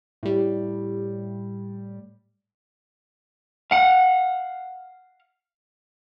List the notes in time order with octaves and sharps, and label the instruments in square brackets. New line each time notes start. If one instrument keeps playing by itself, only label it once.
[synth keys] A2 G3
[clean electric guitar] F5 F#5